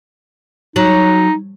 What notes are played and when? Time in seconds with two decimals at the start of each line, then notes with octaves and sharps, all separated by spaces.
0.76 F#3 D#4